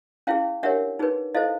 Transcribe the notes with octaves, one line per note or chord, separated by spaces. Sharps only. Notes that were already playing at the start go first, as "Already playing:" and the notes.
C#4 E4 G#4 F5 G5
D4 G4 A#4 C#5 E5 F#5
D#4 G#4 B4
E4 A4 C5 D#5 F5